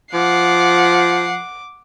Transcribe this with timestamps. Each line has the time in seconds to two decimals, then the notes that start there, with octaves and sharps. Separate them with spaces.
0.14 F3 F#5 D6 C7